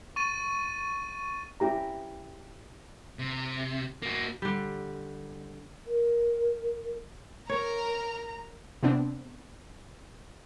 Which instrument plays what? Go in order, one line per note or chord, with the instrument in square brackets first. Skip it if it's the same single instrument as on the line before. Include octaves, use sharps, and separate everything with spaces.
[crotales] C#6 A6 D#7
[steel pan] C#4 E4 G4 A#5
[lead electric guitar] C3
A#3 F#4
[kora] D3 G3
[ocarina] A#4
[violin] A#4 [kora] C#5 [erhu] A#5
[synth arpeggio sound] C3 B3 C4 D4